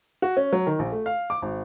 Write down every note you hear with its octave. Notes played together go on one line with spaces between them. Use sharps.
F#4
C#4
F#3
D#3
A#1
A3
F5
D6
G#1